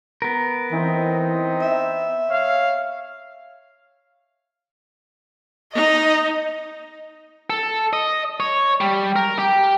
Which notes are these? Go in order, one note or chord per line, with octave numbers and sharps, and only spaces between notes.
B3 A#4
E3 C4 D#4 D#5
E5
C#5 F5
D#4 D#5
A4
D#5
C#5
G3
A#4
G4